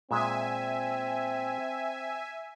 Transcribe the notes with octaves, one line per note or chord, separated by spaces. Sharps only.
A#2 G#3 C4 E5 G#5